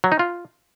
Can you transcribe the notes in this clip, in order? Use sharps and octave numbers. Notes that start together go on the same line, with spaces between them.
F#3
D#4
F4